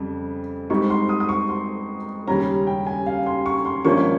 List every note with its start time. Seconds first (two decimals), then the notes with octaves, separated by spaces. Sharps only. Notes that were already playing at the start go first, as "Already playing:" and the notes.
Already playing: F2 C#3 G3
0.70 G#2 G3 C4 D#4 C#6
0.90 C6
1.09 D#6
1.20 D#6
1.29 C#6
1.49 C6
2.27 D#2 C#3 G3 C#4 A#5
2.67 G5
2.87 G#5
3.07 F5
3.26 C6
3.46 C#6
3.65 C6
3.85 G#1 G2 F3 A#3 C#4 C#6